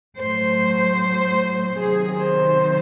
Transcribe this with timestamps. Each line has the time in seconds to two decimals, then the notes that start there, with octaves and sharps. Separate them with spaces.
0.18 A2 F#3 C5
1.79 C3 D#3 F#3 G#4
2.19 C5